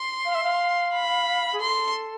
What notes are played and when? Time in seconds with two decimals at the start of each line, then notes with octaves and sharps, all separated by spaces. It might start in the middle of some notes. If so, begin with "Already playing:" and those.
Already playing: C6
0.25 F5
0.35 E5
0.43 F5
0.93 B5
1.53 G#4
1.60 A4 C6